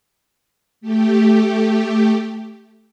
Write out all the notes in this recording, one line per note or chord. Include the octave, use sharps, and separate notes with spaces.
A3 G4